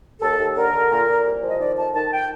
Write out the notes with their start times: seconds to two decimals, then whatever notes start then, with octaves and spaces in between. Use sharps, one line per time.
0.20 D#2 A4
0.38 D#2
0.56 D3 A#4
0.72 D3
0.91 A#2
1.08 A#2
1.24 C2
1.42 F3
1.48 D#5
1.60 D#3 D5
1.77 F2 A5
1.95 D#3 A5
2.13 G5